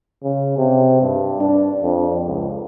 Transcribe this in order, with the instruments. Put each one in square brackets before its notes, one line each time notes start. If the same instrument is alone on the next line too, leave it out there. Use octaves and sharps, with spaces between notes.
[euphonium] C#3
C3
G2
D4
F2
C#2